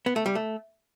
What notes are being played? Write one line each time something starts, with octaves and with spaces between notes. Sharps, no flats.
B3
A3
G3
A3